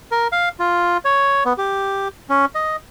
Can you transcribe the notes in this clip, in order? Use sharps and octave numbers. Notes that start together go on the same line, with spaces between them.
A#4
F5
F4
C#5
B3
G4
C#4
D#5